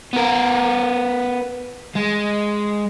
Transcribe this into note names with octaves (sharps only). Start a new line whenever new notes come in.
B3 A#4
G#3